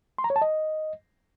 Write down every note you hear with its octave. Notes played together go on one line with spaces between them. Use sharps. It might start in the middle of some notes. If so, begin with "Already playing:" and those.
C6
A#5
C#5
A5
D#5